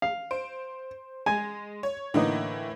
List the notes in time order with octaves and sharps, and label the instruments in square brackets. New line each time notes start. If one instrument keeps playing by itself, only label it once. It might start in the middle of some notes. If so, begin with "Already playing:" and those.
[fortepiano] F5
[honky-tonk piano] C5 D7
[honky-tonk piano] G#3 [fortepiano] G#5
[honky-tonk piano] C#5
[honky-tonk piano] A2 E3 A#3 [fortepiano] D3 D#4